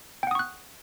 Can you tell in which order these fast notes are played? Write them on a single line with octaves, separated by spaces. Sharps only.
G5 F#5 D#6 C#6 F#6